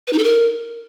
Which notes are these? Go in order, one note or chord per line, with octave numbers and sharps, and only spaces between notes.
B4
D#4
A4
A#4